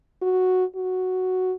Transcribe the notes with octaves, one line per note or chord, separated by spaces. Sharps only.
F#4
F#4